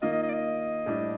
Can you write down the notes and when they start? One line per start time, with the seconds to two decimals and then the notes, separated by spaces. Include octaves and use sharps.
0.02 D#3 A#3 F4 D#5
0.12 D#5
0.23 D#5
0.29 D5
0.33 D#5
0.86 A2 G3 D4